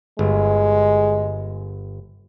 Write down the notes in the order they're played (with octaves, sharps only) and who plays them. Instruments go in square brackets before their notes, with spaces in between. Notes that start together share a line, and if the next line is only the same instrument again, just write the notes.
[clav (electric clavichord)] G1 [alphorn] G#3